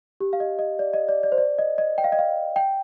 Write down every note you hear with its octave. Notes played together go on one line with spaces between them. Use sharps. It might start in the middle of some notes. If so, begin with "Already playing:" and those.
G4
F5
D#5
D#5
D5
D#5
D5
D5
C5
D5
D#5
D#5
G5
F5
D#5
F5
G5